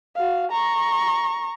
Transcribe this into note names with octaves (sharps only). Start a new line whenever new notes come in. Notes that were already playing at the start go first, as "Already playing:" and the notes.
F#4 F5
A#5 C#6